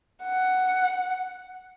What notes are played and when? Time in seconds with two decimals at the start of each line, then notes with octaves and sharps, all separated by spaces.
0.24 F#5